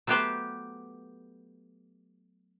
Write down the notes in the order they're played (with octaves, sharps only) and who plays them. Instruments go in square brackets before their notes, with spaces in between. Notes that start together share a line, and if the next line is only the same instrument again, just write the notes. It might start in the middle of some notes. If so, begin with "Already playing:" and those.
[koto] F#3 A3 B3 G4 B4 C5